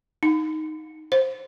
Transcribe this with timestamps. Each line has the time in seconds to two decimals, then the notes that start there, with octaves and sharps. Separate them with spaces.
0.23 D#4
1.12 C5